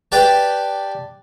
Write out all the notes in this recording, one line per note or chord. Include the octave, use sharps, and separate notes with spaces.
G4 B4 D5 G5 A5